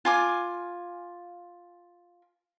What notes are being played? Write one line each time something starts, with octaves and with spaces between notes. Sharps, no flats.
F4 G#5 D6